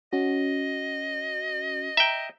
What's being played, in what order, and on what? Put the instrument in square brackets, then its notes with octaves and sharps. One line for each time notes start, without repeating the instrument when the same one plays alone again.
[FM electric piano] C#4 F#4 [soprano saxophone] D#5
[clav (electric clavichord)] E5 G5 [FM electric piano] A#5